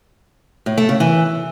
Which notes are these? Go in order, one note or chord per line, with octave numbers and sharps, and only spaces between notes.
A2
A3
C#3
E3